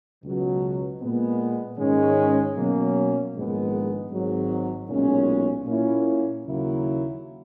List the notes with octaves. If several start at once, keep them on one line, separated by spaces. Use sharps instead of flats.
C#2 B2 F#3
A#2 G#3 B3
G#2 D#3 G#3 C#4
B2 F#3 A#3 C#4
A#1 G#2 D#3 G#3 B3
G#1 G#2 F#3
B1 A#2 G#3 C#4
A#2 A#3 C#4 E4
D#2 C#3 F#3 A#3 E4